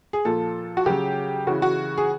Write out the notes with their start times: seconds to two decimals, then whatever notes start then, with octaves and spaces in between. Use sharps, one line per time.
0.13 G#4
0.25 A#2 F3 A4
0.77 F#4
0.86 C#3 F#3 G4
1.47 C#3 E3 F#4
1.62 F#4
1.98 G#4